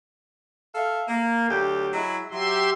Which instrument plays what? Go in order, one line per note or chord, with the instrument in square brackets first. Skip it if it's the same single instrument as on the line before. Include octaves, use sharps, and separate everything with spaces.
[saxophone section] A4 E5 F5
A#3
D2 F#3 G4
F#3 G#3 E4
[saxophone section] F#3 [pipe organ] G4 E5 C6